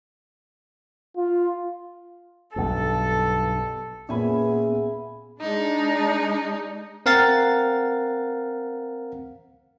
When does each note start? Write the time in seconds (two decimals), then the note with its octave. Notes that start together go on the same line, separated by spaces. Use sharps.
1.17 F4
2.56 B1 G2 A4
4.09 A#2 B3 C#4 G#4 E5 G#5 B5
5.41 G#3 D4 D#4
7.06 C4 A#4 F5 F#5 A6